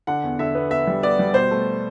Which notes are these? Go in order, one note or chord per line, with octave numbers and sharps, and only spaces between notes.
D3 F#5
E2
D3 E5
B3
B3 E5
G3
B3 D5
G3
B2 C5
A3